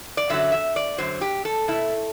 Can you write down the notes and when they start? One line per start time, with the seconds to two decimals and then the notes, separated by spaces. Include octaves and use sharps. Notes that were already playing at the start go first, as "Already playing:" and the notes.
0.17 D5
0.30 F#2 D3 F#3 E5
0.52 E5
0.76 D5
0.98 F#2 D3 F#3 C5
1.21 G4
1.45 A4
1.68 B2 A3 E4